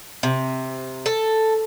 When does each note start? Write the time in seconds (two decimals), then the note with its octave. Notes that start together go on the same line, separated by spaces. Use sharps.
0.23 C3
1.06 A4